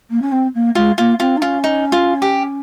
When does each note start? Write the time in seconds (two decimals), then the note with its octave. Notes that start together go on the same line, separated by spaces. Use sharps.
0.10 A#3
0.22 C#4
0.32 C4
0.55 A#3
0.75 G#3 F4
0.98 A#3 F4
1.19 C4 F4
1.37 D#4
1.42 C#4 F4
1.64 D#4
1.92 F4
2.22 G4